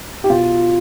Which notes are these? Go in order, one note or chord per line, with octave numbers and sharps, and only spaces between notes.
G4
B2 F4